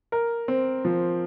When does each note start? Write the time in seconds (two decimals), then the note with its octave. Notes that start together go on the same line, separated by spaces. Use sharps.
0.12 A#4
0.48 C4
0.85 F3